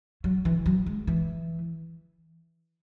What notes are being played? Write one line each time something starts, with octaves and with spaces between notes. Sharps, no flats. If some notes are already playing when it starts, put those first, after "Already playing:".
F#3
E3
F#3
G#3
E3